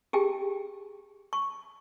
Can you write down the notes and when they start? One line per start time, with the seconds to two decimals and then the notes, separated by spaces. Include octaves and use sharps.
0.13 G4 G#4 G5
1.33 C#6